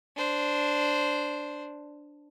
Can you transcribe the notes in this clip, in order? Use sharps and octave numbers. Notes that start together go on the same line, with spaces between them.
D4 C5